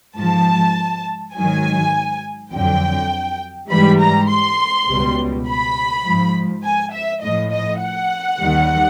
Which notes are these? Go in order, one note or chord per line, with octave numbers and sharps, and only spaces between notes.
G#2 F3 A5
G#2 D#3 F#3 G#5
F2 D3 F#3 G5
G#2 E3 G3 B5
A#5
C6
C#2 B2 G3
B5
G#2 F3
G#5
E5
A2 F3 D#5
D#5
F#5
D#2 D#3 G3